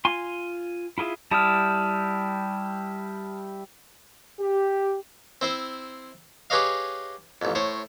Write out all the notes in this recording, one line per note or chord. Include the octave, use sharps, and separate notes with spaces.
F4 G#5 C6
E4 F4 G#4 E5
G3 E4 A5 D#6 F6
G4
C4 E4 C5
G4 G#4 B4 C#5 D#5 F5
A1 F2
A2 C5 C#5